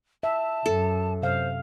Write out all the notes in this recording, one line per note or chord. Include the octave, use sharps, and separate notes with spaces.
E5 A5
F#2 A4
C3 C5 F5